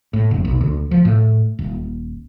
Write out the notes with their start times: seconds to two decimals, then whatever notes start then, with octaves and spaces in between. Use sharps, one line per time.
0.13 A2
0.31 F1
0.45 B1
0.61 D2
0.91 F3
1.05 A2
1.59 D#1